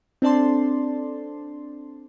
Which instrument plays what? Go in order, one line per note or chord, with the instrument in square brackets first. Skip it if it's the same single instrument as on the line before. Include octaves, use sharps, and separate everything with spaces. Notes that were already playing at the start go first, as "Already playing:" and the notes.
[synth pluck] C4 D4 A4 D5 A5 C6